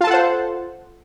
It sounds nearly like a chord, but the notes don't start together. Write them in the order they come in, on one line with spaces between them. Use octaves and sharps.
F4 A5 A4 F#5 C5